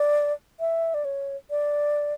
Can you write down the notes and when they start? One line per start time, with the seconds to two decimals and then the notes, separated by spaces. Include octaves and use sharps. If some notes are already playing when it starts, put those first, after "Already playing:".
Already playing: D5
0.60 E5
0.94 D5
1.05 C#5
1.50 D5